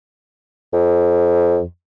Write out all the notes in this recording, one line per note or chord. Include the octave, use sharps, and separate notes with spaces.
F2